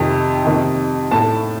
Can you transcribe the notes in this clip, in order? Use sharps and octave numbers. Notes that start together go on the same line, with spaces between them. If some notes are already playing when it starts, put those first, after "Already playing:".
Already playing: F2 C3 D#3
F2 C3 D#3
A2 A3 A5